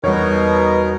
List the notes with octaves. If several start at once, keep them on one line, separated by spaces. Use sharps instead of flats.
E2 B2 G3 D#4 A#4 C#5